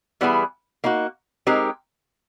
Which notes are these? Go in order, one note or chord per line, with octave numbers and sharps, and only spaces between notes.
E3 G3 B3 E4 G#4
A#3 D#4 F#4
G#3 C4 D#4 G4 A#4